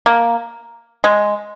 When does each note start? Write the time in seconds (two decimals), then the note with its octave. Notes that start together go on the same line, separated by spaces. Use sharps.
0.06 A#3
1.04 G#3